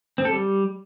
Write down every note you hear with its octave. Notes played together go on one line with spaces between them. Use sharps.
C4
A4
G3